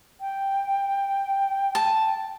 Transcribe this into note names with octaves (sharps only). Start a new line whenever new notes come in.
G5
A5